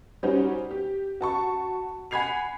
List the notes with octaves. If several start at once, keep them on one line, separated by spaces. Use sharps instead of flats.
G3 C#4 D#4 F#4 C5
G4
F#4 A5 C#6
F#5 G#5 B5 G#6 C7 F7